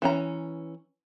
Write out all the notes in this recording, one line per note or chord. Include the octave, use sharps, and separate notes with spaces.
E3 C#4 A#5